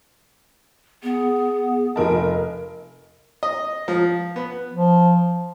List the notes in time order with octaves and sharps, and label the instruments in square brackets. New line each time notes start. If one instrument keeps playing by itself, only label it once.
[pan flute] B3 [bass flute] G#4
[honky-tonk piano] F1 A#4 A5 [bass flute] D#5
[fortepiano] D#5
F3
B3
[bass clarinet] F3